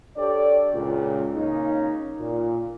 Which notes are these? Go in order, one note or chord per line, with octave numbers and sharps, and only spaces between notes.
D4 G4 A4 C#5 D5
C#2 A#2
C#3 A#3 C#4 D#4
A#2